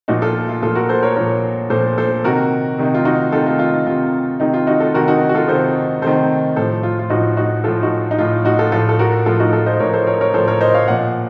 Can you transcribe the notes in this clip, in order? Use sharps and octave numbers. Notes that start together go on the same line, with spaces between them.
A#2 F3 D#4 F#4
F4 A4
F4
A#2 F3 F4 A4
F#4 A#4
A4 C5
A#4 C#5
A#2 F3 A#4 C#5
A#2 F3 A4 C5
A4 C5
C3 D#3 F#4 A#4
C3 D#3 D#4
F4
D#4 F#4
C3 D#3 F4 A4
F4
F4
D#4
C3 D#3 F4
C3 D#3 D#4
F4
D#4 F#4
F4 A4
C3 D#3 F#4 A#4
D#4 F#4
F#4
F4 A4
C3 D#3 A4 C5
C3 D#3 A4 C5
A2 F3 A4 C5
F4
F4
A2 F3 D#4 F#4
D#4 F#4
A2 F3 F4 A4
D#4 F#4
D#4
A2 F3 F4
D#4 F#4
F4 A4
A2 F3 F4 A4
A4
F#4 A#4
A2 F3 F4 A4
D#4 F#4
F4 A4
C5 D#5
A2 F3 A#4 C#5
A4 C5
A#4 C#5
A#4 C#5
A2 F3 A4 C5
A#4 C#5
C5 D#5
C#5 F5
A#2 F3 D#5 F#5